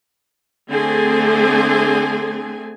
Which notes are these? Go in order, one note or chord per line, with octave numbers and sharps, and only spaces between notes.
D3 A3 C4 G#4 G#5